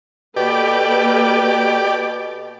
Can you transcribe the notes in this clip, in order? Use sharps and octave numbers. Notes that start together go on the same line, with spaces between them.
B2 A#3 G4 A4 B4 D5